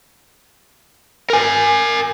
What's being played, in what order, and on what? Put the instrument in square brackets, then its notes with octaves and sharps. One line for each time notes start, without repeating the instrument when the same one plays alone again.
[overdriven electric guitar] A#4 G#5